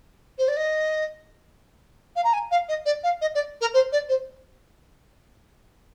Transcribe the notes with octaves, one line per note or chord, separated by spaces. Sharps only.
C5
D5
D#5
F5
A#5
G#5
F5
D#5
D5
F5
D#5
D5
A#4
C5
D5
C5